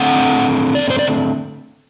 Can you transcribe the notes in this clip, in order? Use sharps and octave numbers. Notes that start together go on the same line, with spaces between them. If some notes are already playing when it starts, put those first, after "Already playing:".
Already playing: D3 A3 C4 F#5
D5
C5
D5